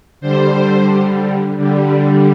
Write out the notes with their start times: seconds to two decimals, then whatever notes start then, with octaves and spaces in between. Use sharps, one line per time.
0.21 D3 G3 C5
1.57 D3 G3